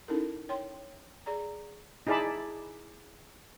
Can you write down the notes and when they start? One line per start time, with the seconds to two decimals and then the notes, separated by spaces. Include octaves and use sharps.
0.08 C#4 D#4 E4 A4 A#4
0.49 C#5 G5 C6
1.26 G#4 D5 A#5
2.07 D#4 E4 G#4 D5 A5 B5